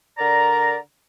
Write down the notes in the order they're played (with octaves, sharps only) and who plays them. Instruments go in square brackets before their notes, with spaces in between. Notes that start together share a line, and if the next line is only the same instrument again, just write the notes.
[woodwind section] D3 A#4 D5 A#5